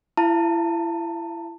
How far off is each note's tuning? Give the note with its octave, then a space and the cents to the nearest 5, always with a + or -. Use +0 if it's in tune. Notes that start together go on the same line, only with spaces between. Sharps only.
E4 +30 F5 -35 A5 +20